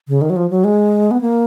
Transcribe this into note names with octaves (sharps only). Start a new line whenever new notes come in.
C#3
D#3
F#3
F3
F#3
G#3
B3
A#3